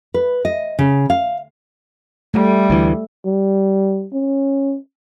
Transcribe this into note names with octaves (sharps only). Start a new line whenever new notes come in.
B4
D#5
C#3
F5
G3 A3
D2 E3
G3
C#4